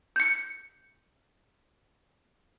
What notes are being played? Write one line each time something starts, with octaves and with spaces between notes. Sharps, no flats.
G6 C#7